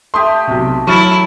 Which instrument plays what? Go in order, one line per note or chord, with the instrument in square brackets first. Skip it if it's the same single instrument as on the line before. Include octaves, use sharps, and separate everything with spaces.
[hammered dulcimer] A3 G4 [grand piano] C6 D#6
[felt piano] B1 C3
[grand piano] F#3 [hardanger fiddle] E4 [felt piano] C#6 F6 A6